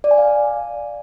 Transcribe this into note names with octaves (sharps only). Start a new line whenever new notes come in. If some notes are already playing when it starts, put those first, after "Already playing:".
D5
G#5
F5